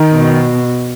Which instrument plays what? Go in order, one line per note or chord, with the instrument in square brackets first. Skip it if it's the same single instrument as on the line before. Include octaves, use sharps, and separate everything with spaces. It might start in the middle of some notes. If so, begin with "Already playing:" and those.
Already playing: [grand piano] D#3
[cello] B2